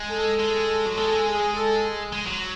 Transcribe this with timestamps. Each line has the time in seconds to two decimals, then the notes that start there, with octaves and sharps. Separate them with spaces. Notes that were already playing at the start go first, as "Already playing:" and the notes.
Already playing: G#3
0.11 A4
0.39 G#3
0.86 F#3
0.97 G#3 A4
1.26 G#4
1.55 A4
1.84 G#4
2.13 G#3
2.26 F#3